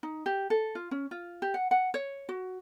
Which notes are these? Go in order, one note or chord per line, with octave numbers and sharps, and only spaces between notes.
D#4
G4
A4
F4
C#4
F4
G4
F#5
F#5
C#5
F#4